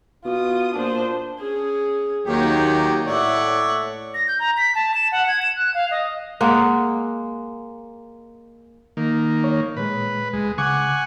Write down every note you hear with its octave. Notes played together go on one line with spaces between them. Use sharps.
B2 F4 D#6
A#2 D4 C5
C#4 G#4
D#2 D#3 F#3 A#3 G4 C#5
A2 C#5 D5 E5 F#5
A#6
G6
A#5
B6
A5
E7
F#5
G#6
E7
F#6
F5
D#5
G#3 A#3 F#5
D#3 A#3
C#5
A#2 G#3 B4
C#2 G#3
C#3 F#5 G#5 C#6 D6